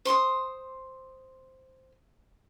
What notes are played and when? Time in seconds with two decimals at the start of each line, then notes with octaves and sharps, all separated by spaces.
0.05 C5 C6 C#6 D#6